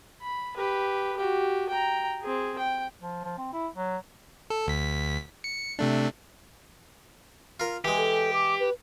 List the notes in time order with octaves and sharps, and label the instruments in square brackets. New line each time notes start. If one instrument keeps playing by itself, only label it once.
[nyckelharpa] B5
G4 B4
F#4 G4
G5 A#5
C4 G#4
G5
[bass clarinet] F3
F3
C4
E4
F#3
[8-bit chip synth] A4
D2 B6
C#7
C3 A3 D4
[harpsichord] F4 A#4
[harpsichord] E3 G#3 [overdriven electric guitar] G4
[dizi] A4
D6
B4